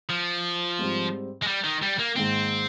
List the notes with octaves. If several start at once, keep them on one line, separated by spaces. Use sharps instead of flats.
F3
G#2 G3 C4
G#3
G3
D#3
G3
A#3
G#2 D#3 A#3 C4